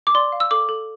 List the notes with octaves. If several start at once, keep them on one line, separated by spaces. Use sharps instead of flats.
D6
D5 C6
F5
E6
A4 D6
A4